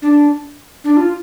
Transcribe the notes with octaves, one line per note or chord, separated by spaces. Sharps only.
D4
D4
F4